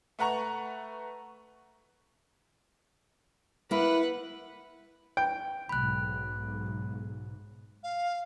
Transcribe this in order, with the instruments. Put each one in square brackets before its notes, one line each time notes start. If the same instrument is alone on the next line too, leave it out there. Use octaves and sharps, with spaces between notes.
[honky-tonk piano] A3 B4 F#5 A#5 C#6 F7
[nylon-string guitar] A#3 E4 [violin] B4 F#5
[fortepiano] G5
[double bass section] B1 G#2 [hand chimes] B5 F#6
[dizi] F5